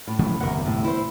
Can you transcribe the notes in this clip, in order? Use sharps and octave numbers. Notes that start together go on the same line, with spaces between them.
A2
C#3 F3 A3
G1 E2 C3 A#4 F#5
A2
E4 C5